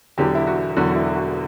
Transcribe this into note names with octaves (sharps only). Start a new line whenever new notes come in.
E1 E2 D3 F#3 G4
E4
F#4
E1 E2 D3 F#3 F#4
F#4
E4
F#4